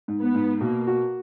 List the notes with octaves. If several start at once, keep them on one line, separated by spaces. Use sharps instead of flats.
G#2
B3
G#2
B2 A#3
F#4